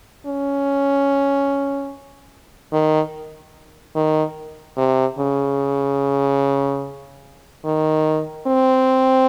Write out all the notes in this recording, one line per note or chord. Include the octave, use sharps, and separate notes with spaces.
C#4
D#3
D#3
C3
C#3
D#3
C4